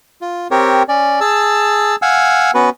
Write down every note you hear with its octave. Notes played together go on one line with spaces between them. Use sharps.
F4
C4 G4 A#4 C#5
C#4 D5
G#4 A5 E6
F5 F#5 G#5 E6
B3 C#4 F#4 B4